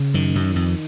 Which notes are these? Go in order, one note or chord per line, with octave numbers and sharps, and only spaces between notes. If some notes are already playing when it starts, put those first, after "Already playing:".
Already playing: C#3
F#2 D#3
F#2
F2